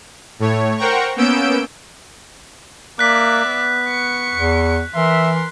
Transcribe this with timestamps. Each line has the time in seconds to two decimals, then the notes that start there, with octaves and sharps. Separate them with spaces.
0.39 A2 A3 C#5
0.78 A#4 C5 F#5 G5 A#5 C#6
1.16 A#3 B3 C#4 E6 G6 D7
2.99 A#3 D5 E5 F#6 B6
3.45 B3
3.88 C#6 C#7
4.34 E2
4.95 E3 A#4 E5 C6